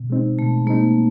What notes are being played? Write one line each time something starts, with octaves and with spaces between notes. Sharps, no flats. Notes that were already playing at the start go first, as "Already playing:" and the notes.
Already playing: B2
G#3 C4 D#4
B2 A3
G#3 A#3 C4 D#4